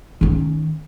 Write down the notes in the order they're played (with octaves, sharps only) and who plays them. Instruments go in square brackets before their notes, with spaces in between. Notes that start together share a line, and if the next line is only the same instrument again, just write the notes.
[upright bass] D#3 C#4